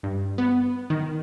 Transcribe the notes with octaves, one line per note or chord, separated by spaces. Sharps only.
G2
B3
D#3